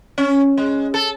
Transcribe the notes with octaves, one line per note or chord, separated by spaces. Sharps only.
C#4
G#3
A4